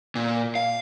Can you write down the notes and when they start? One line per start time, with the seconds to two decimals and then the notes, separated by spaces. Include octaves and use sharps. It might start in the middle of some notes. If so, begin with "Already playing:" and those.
0.15 A#2
0.55 F5